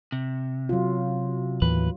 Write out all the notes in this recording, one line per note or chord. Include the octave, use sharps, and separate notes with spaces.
C3
F#3 F4
D#2 A2 E3 B4